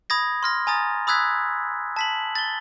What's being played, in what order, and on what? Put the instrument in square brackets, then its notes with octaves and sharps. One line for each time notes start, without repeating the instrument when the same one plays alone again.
[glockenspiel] B5 D#6 G#6 A#6
C6 F6 A#6
G#5 A#5 D#6 A6
B5 D#6 E6 F#6 G#6 B6
A5 B6 F#7
A6 G7